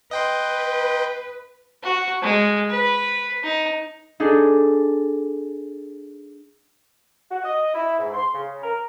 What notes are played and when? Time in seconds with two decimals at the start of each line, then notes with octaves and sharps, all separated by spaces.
0.11 B4 D#5 G5 C6
1.83 F#4
2.22 G#3
2.70 B4
3.44 D#4
4.20 D4 D#4 G#4 A4
7.31 F#4
7.44 D#5
7.74 E4
7.99 G#2
8.14 C6
8.33 C#3
8.63 A#4